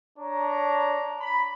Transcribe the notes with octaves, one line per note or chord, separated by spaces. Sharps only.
D4 C#5 A#5
B5